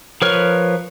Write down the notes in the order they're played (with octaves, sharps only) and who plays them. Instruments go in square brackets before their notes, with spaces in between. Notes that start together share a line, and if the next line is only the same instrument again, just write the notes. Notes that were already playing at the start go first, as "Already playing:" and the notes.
[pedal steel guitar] F3 A#4 B4 C#5 F6